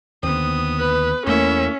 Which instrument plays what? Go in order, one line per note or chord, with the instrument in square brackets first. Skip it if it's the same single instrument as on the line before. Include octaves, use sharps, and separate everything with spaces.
[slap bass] D#2 D3 [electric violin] B3 D#6 [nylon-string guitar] C4
[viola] B4
[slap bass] E2 [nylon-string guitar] A3 A#3 E4 [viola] C#4 [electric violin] E5